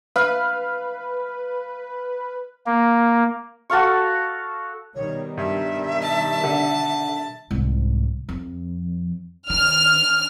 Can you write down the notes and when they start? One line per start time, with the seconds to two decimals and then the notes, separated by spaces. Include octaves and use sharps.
0.16 B4 F5
2.66 A#3
3.70 F#4 A4 F5 C#6
4.95 B2 D#3 G3 C#5
5.37 G2 E5
6.02 A5
6.44 D3
7.51 C2 G#2
8.29 F2
9.50 D#3 F6